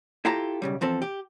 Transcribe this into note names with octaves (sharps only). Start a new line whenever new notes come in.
E4 F4 G4 A4 A#5
B1 C#3 G3
E2 F3 C4 A4
G4